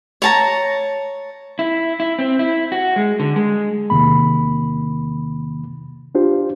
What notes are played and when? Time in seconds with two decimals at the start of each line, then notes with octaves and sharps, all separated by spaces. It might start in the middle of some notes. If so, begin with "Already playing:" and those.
0.22 C#5 A5 A#5
1.59 E4
2.00 E4
2.19 C4
2.39 E4
2.72 F#4
2.96 G#3
3.20 D3
3.36 G#3
3.90 E2 C3 D#3 A#3 B5
6.15 D4 F4 G4 C5